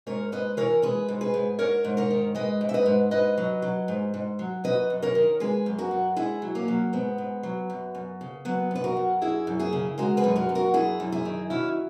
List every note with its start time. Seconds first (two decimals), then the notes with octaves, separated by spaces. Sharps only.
0.07 G#2 A#4 C#5
0.32 G#2 B4 D#5
0.57 E3 A#4 C#5
0.82 G#3 G#4 B4
1.08 G#2
1.21 G#4 B4
1.34 G#2
1.59 G#2 A#4 C#5
1.84 G#2
1.97 A#4 C#5
2.10 D#3
2.35 G#3 B4 D#5
2.61 G#2
2.69 E5
2.74 B4 D#5
2.86 G#2
3.11 G#2 B4 D#5
3.37 F#3
3.62 F#3
3.88 G#2
4.14 G#2
4.39 F#3
4.64 F#2 B4 D#5
4.90 F#2
5.02 A#4 C#5
5.15 D#3
5.40 G#3 G#4 B4
5.66 F#2
5.79 F#4 A#4
5.91 F#2
6.16 G#2 E4 G#4
6.42 F#3
6.55 A#3 C#4
6.68 F#3
6.93 G#2 B3
7.18 G#2
7.43 F#3
7.70 F#2
7.95 F#2
8.21 C#3
8.45 F#3 B3
8.71 F#2 B4
8.84 F#4 A#4
8.97 F#2
9.22 F#2 E4 G#4
9.47 F#2
9.59 E4 G#4
9.72 C#3
9.98 G#3 F#4 A#4
10.17 G#4 B4
10.24 F#2
10.36 F#4 A#4
10.49 F#2
10.55 F#4 A#4
10.74 F#2 E4 G#4
11.00 F#2
11.12 E4 G#4
11.25 D#3
11.50 F#3 C#4 E4